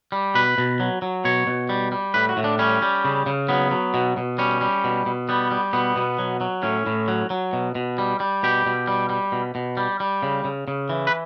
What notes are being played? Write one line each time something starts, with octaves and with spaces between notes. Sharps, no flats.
G3
B2 B4
B2
F#3
F#3
B2 C#5
B2
G3
G3
A2 B4
F#4
A2
D4
G3 C#4
G3
C#3
C#3
F#3 B3
F#3
B2
B2
G3 C#4
G3
B2
B2
G3 B3
G3
B2 B3
B2
F#3
F#3
A2 C#4
A2
F#3
F#3
B2
B2
G3
G3
B2 G4
B2
G3
G3
B2
B2
G3
G3
C#3
C#3
C#3
E3
B4